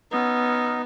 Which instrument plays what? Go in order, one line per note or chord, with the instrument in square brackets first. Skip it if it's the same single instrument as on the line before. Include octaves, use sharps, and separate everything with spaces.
[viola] B3 [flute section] C#4 F#5 E6 [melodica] D#4